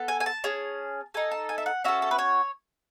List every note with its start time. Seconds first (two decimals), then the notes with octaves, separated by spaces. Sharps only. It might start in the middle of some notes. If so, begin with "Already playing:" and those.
Already playing: B3 A4
0.08 G#5
0.20 G#5
0.26 A5
0.44 C#4 G#4
1.14 D#4 A4 G#5
1.31 A5
1.49 G#5
1.58 E5
1.66 F#5
1.84 C#4 F#4 A4 E5
2.02 A4
2.11 B4
2.19 C#5